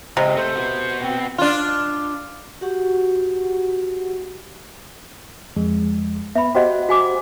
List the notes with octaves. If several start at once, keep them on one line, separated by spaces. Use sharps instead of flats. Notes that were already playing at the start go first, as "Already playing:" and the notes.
C#2 C3 D#5
A3 C5
B3 F#4
C4
D4 F4
F#4 G4 F#5 C#6
F2 G#3
B3 E5 B5
F#4 G4 C5 D#5 F#5
F#4 G#5 D6